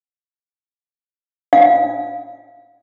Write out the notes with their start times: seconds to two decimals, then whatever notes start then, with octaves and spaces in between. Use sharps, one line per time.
1.53 F5